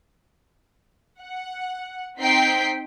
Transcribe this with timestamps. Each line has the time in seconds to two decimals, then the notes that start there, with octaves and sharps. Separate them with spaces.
1.20 F#5
2.20 C4 D#4 G5 B6 C7